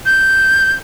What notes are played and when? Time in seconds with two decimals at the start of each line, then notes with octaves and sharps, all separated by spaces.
0.06 G6